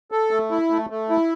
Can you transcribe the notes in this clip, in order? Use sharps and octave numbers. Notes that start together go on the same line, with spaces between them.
A4
A3
E4
A3
A3
E4